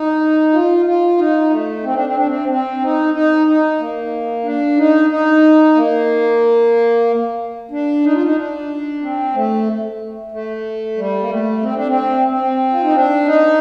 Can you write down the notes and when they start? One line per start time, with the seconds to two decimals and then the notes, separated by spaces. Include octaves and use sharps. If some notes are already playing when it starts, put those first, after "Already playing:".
Already playing: D#4
0.53 F4
0.86 F4
1.18 D#4
1.50 A3
1.83 C4
1.95 D4
2.05 C4
2.16 D4
2.28 C4
2.49 C4
2.82 D#4
3.14 D#4
3.47 D#4
3.79 A#3
4.44 D4
4.77 D#4
5.10 D#4
5.75 A#3
7.71 D4
8.03 D#4
8.13 F4
8.23 D#4
8.36 D4
9.01 C4
9.34 A3
10.32 A3
10.97 G3
11.21 A#3
11.30 A3
11.62 C4
11.75 D4
11.87 C4
12.28 C4
12.72 F4
12.82 D#4
12.93 D4
13.26 D#4